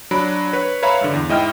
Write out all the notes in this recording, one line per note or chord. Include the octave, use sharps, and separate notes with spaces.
F#3 D4 B5 D7
B4 C#5
B4 C#5 E5 F5 A#5 B5
G2 D3
E2
G#2 E4 D#5 E5 G5 F6